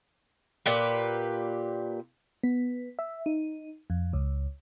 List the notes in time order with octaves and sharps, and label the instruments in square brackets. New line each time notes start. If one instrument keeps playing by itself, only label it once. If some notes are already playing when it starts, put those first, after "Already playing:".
[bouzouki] A#2 G4 B4
[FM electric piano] B3
E5
D#4
F2
C#2